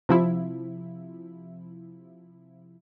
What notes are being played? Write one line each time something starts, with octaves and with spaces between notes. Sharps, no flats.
C3 F3 E4